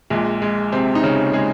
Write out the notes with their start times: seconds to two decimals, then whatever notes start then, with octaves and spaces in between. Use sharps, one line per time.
0.10 A#1 A#2 G#3
0.42 G#3
0.72 C3 C4
0.95 D#4
1.03 C#3 C#4
1.33 G#3 G#4